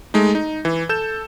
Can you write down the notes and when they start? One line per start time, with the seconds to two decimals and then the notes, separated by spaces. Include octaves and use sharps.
0.14 G#3 A3 D#4
0.35 D#4
0.65 E3
0.89 A4 G6 E7